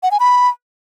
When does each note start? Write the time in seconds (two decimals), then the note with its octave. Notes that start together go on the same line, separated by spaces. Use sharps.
0.03 F#5
0.11 G#5
0.20 B5